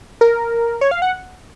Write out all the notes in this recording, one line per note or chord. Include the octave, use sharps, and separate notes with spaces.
A#4
C#5
F5
F#5